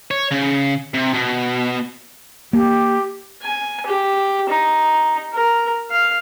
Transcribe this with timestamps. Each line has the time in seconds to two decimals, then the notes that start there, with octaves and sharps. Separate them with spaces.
0.11 C#5
0.31 C#3
0.94 C3
1.14 B2
2.53 A#3 G4
3.42 G#5
3.86 G4
4.49 D#4
5.33 A#4
5.91 F5